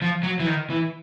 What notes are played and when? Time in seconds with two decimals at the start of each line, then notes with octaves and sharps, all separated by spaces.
0.02 F3
0.23 F#3
0.39 E3
0.47 D#3
0.70 E3